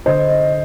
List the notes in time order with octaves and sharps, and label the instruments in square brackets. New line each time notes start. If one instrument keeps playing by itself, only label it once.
[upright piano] D3 C5 D#5